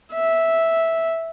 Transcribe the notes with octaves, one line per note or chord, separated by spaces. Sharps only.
E5